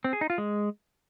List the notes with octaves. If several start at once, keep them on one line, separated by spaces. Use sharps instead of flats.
C4
G#4
D#4
F4
G#3